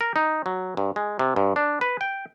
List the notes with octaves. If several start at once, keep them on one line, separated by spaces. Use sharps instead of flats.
A#4
D#4
F#3
G2
G#3
C3
G2
D4
B4
G5